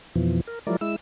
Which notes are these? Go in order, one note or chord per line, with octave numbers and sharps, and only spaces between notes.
F2 B2 E3 F3
A#4
F3 F#3 G#3 E4 A#4 D5
G#3 E4 E6